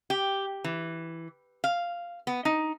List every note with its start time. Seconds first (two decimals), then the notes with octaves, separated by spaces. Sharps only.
0.10 G4
0.64 E3
1.64 F5
2.27 B3
2.45 D#4